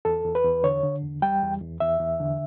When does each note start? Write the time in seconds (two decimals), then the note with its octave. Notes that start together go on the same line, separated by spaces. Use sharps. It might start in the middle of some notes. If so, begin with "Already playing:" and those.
0.05 E2 A4
0.25 E2
0.35 B4
0.44 E2
0.63 D3 C#5
0.83 D3
1.02 E2
1.22 G3 G5
1.42 E2
1.61 E2
1.80 E2 E5
2.00 E2
2.20 D3